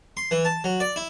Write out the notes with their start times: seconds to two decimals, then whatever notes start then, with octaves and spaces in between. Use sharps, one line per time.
0.17 C6
0.31 E3
0.45 A5
0.64 F#3
0.80 D5
0.96 E4